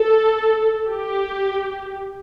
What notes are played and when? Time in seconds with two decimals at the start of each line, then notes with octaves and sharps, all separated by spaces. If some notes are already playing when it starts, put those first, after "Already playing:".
Already playing: A4
0.89 G4